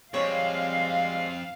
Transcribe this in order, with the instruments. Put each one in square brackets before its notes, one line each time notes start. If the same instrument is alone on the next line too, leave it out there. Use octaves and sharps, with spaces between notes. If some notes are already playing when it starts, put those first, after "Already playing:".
[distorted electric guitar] F2 [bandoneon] G3 G#3 C4 [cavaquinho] C#5 [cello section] F5